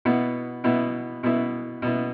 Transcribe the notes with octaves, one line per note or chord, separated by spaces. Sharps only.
B2 B3 E4
B2 B3 E4
B2 B3 E4
B2 B3 E4